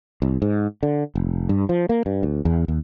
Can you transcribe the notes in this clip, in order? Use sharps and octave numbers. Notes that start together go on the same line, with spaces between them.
C2
G#2
D3
F1
G2
F3
A#3
G2
D2
E2
D#2